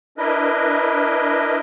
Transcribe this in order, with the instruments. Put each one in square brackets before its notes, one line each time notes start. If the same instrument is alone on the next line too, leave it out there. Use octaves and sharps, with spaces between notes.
[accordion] D4 E4 A#4 B4 D#5